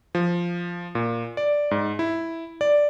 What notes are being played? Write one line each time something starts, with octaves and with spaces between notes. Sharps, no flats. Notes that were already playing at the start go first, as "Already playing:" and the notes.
F3
A#2
D5
G#2
E4
D5